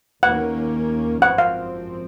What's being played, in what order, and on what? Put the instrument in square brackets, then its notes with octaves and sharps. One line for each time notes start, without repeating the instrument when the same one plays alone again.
[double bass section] D#2 D#3 A#3 C#4 [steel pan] F#5
[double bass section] G#1 F#2 F3 C4 [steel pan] F#5
[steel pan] F5